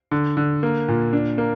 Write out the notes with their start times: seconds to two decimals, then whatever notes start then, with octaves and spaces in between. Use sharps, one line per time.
0.11 D3
0.37 D3
0.63 A#3
0.88 A#2
1.13 D4
1.38 A#3